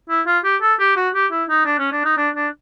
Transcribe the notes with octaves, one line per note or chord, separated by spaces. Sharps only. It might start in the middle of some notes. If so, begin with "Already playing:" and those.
E4
F4
G4
A4
G4
F#4
G4
E4
D#4
D4
C#4
D4
D#4
D4
D4